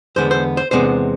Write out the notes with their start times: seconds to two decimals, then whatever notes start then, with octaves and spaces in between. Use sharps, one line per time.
0.16 E2 D3 G#3 B3 C5
0.31 C5
0.57 C5
0.71 E2 C3 G#3 B3 D4 C5